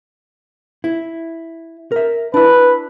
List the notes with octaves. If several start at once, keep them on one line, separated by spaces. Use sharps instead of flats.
E4
A#4 E5
D4 E4 B4